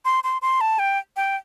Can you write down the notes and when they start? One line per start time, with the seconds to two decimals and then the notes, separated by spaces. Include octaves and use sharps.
0.05 C6
0.24 C6
0.42 C6
0.61 A5
0.79 G5
1.16 G5